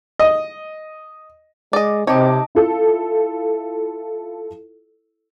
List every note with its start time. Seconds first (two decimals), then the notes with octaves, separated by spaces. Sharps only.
0.19 D#5
1.73 G#3 D5 D#5
2.07 C3 C4 D#4 C#5 A5 D6
2.55 E4 F4 A4